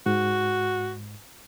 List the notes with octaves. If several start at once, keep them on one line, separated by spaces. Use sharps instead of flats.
G#2 F#4